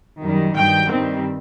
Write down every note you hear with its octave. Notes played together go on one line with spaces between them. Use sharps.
F#2 D#3 G3
G2 D#3 F#3 G5
G2 D#3 G3 C4